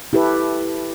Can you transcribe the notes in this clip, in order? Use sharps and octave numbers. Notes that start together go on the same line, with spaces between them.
E4 G4 A4 B4